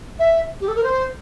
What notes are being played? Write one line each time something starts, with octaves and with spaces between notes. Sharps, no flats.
E5
G4
A4
A#4
C5